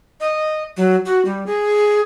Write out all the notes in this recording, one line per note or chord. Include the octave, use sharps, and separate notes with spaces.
D#5
F#3
F#4
G3
G#4